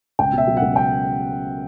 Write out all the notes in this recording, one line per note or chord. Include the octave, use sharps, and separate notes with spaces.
C#2 G5
B2
E5
F#3
F#5
C#2
G5